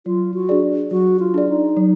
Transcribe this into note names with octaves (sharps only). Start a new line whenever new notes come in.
F#3 F4
F#4
D4 G#4 D5
F#3 F#4
F4
D4 G#4 D5
D#4
F#3